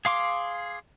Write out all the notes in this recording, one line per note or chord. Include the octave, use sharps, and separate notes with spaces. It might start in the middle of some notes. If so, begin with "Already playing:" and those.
G#4 F5 C6 D6